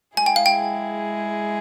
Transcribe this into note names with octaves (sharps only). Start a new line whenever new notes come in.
G#3 E4 G#4 G#5
G5
F5
G5